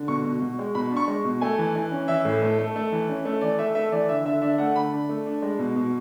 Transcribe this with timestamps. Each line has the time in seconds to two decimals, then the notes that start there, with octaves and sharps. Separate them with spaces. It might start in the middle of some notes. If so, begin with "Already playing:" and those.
Already playing: D3
0.08 B2 C#6
0.24 B2
0.42 B2
0.59 G#3
0.75 B2 B5
0.91 D4
0.97 C#6
1.08 G#3
1.25 B2
1.41 A3 G#5
1.58 E3
1.75 E3
1.91 C#4
2.08 E3 E5
2.25 A2
2.42 A3
2.58 A3
2.76 A3
2.92 E3
3.09 C#4
3.25 A3
3.41 E3 D5
3.59 A3 E5
3.75 A3 E5
3.92 E3 D5
4.09 D3 E5
4.25 D3 E5
4.42 D4 E5
4.58 A3 F#5
4.75 D3 B5
4.92 D4
5.09 A3
5.26 D4
5.42 G#3
5.59 B2
5.76 B2